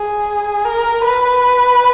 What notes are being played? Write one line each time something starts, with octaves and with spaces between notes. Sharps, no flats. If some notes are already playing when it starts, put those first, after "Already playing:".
Already playing: G#4
A#4
B4